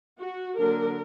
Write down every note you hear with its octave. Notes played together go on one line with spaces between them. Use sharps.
F#4
D3 F#3 A#3 D4 A#4